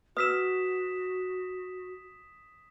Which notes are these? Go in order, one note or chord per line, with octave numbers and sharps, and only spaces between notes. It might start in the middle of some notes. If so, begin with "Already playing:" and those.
F#4 B4 D#6 E6 B6 E7